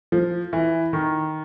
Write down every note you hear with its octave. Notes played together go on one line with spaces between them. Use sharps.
F3
E3
D#3